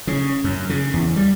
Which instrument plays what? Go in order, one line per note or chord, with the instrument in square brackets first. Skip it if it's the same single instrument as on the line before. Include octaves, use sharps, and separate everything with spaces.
[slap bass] C#3
F#2
C#3
E2
G3